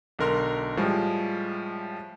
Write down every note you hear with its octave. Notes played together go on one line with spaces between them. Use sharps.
B1 D3 A#4 C6 F6
A2 F3 G3 G#3